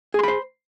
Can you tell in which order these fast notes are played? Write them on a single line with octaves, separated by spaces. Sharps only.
G#4 C6 B5 C5